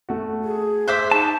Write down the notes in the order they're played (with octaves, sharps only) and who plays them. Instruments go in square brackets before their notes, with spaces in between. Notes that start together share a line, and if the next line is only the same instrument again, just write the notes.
[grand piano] A3 F#4
[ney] G#4
[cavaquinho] C5 E5 D6 [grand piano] F#6 G6 B6
[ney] D#4 [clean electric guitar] A5 [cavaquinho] C#6